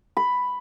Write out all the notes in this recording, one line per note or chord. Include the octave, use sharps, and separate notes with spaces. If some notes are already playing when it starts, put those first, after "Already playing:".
B5